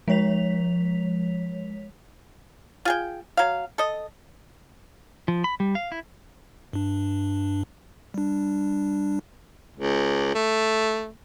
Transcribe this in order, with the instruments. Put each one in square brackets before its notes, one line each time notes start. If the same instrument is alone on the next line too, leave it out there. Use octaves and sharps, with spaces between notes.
[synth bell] F3 G#3 C#5 B6 F7
[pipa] F4 G#4 G5
F#3 F5
A4 D#5
[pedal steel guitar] F3
B5
G3
F5
E4
[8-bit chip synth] G2 D4
G3 D4
[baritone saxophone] C#2
A3